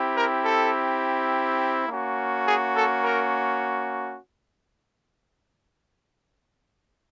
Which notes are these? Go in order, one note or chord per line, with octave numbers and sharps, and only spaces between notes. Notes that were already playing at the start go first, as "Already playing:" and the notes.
Already playing: C4 E4 G4
A#4
A4
A#3 C#4 F#4
G#4
A4
A#4